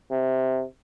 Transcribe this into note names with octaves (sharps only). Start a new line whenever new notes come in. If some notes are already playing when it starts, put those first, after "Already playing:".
C3